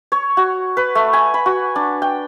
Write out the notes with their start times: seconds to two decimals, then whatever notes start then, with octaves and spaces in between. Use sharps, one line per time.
0.12 C#5
0.37 F#4
0.77 B4
0.95 A3
1.13 G#5
1.34 B5
1.46 F#4
1.76 D4
2.02 G5